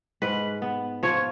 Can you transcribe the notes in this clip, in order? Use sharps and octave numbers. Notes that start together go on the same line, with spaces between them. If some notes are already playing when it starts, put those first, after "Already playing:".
G#2 B4
B3
F3 C#5